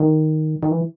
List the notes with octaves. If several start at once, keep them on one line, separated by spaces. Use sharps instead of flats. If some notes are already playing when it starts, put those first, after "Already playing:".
Already playing: D#3
D#3
E3